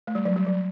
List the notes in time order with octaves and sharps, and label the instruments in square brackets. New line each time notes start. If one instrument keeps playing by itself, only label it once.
[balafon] A3
G3
F#3
G3
F#3